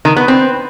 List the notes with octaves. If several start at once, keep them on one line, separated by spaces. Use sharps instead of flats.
D#3
B3
C4